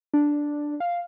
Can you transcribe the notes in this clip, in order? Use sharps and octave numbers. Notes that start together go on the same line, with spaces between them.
D4
F5